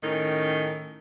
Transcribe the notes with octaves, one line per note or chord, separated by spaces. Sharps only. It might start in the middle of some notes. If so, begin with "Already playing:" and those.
A2 D#3 C#4